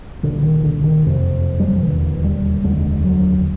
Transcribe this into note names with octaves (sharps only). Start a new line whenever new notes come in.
C2 A#2 D3
D#3
D3
D#3
F#1 F2 C3
G3
F#3
F3
E1 D#2 D3 E3
G3
F1 D#2 D3 G#3
F#3